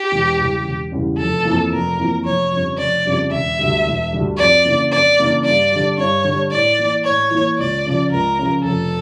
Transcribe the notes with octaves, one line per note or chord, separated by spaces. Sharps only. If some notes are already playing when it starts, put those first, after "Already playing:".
Already playing: G4
E1
E2 C#3 G3 C#4
E1
E2 C#3 G3 C#4
F1 A4
F2 E3 A#3
F1 A#4
F2 E3 A#3
F1 C#5
F2 C#3 G3 D4
F1 D5
F2 C#3 G3 D4
E1 E5
D2 D3 G3
E1
D2 D3 G3
F2 D5
C#3 E3 A#3 D4
F2 D5
C#3 E3 A#3 D4
G2 D5
D3 G3
G2 C#5
D3 G3
A2 D5
E3 A#3
A2 C#5
E3 A#3
C#2 D5
C#3 F3 C#4
C#2 A#4
C#3 F3 C#4
F1 A4